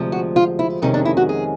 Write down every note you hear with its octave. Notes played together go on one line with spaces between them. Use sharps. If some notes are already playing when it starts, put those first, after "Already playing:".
Already playing: D2 C3 F3 G#3
F#4
F4
E4
F2 C3 D#3 G#3 C#4 D#4
D4
E4
F#4
G#4